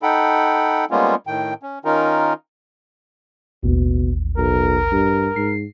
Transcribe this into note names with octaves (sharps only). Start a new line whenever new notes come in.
D#4 A4 F#5 G5 B5
G3 G#3 A#3 B3 C#4 F4
A2 D#3 G5
C#4
D#3 C#4 D#4 F4 A#4
A1 D#2 B2
B1 A#4
G2
G#2 C7